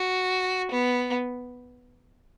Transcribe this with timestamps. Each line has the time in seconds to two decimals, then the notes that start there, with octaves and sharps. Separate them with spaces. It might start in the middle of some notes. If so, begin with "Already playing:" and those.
Already playing: F#4
0.71 B3